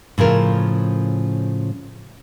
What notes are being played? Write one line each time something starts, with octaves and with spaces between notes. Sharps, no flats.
A2 C#3 F3 A#4